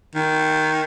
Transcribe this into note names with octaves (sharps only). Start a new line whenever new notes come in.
D#3